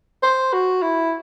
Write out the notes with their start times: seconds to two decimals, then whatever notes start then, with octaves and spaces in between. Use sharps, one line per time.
0.23 C5
0.53 F#4
0.82 E4